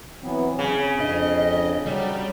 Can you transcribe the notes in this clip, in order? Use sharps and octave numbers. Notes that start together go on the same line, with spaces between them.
E3 F#3 B3 C4
C#3 G#5
F2 D4 D#5
F#3 G3